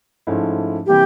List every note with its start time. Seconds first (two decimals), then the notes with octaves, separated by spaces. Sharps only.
0.27 G#2 F3 A3 C#4 E4
0.87 C3 E3 G3 A#3 G4